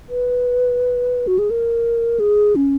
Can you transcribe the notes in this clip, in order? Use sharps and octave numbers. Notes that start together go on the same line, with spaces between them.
B4
F#4
G#4
A#4
G#4
C#4